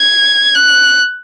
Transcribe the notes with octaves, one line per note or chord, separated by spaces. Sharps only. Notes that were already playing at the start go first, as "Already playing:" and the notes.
Already playing: G#6
F#6